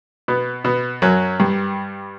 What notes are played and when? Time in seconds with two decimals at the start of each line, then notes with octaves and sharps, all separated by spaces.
0.28 B2 B3
0.65 B2 B3
1.02 F#2 F#3
1.40 G2 G3